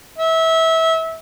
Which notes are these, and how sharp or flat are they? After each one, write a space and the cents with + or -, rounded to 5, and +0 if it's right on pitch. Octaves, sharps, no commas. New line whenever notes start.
E5 -25